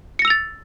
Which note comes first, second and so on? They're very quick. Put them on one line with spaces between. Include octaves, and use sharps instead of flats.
C#7 A#6 E6 F7 A6